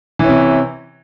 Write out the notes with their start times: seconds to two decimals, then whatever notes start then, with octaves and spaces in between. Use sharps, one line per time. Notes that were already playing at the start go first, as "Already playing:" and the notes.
0.19 E3
0.24 C#4
0.29 C3